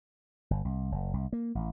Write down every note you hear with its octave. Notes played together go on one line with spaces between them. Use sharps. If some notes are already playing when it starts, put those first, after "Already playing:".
G1
C2
F#1
C2
A#3
A1